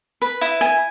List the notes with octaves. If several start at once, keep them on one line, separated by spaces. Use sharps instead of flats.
B4
E4
G#5